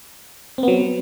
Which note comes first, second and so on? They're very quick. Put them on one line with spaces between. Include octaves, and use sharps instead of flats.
C4 B3 F#3